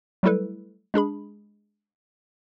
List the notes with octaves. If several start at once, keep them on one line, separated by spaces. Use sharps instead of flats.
F#3 G3 A3 E4 A4 B4
G#3 D4 G#4 B5